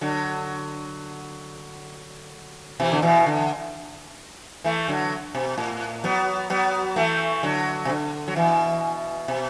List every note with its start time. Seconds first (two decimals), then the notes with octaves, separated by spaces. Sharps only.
0.01 D3 F#3
2.80 B2 E3
2.92 D3
3.02 B2 E3
3.26 D3
4.64 E3 A3
4.88 D3 F#3
5.35 B2
5.58 A2
6.04 F#3 B3
6.50 F#3 B3
6.96 E3 A3
7.43 D3 F#3
7.85 B2
7.89 D3
8.28 F#3
8.36 B2 E3
9.28 B2